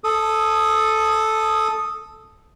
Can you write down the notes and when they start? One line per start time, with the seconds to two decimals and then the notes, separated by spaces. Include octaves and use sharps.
0.04 A4 D#6